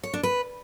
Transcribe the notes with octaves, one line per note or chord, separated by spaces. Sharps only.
C#5
D4
B4